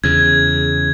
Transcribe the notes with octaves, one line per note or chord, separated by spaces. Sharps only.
E2 C#3 G#6